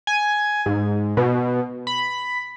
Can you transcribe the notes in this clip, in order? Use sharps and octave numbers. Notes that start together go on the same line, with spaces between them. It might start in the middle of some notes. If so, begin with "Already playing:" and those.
G#5
G#2
B2
B5